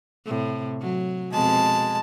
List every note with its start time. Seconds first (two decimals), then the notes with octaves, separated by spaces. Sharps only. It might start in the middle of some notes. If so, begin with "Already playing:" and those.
0.26 A2 C3
0.81 F#3
1.32 F2 B2 G#3 A5